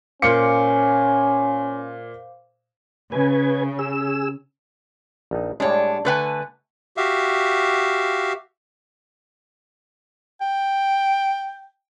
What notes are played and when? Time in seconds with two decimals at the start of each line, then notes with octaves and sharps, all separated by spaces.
0.22 A#2 C#4 C5 F5 D6 C#7
3.12 C#3 B4 G#5
3.79 G#4 E6
5.31 A#1 D#4
5.60 A2 G3 G#3 D4 C#5
6.05 D3 A3 A4 B4 F#5 G#5
6.97 F#4 G4 E5 F5
10.41 G5